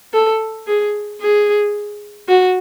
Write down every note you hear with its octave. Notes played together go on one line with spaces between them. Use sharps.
A4
G#4
G#4
F#4